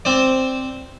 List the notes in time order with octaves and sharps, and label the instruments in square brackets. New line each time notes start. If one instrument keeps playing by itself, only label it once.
[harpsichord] C4 C5 D5